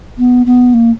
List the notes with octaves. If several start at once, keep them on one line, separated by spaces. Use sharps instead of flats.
B3
B3
A#3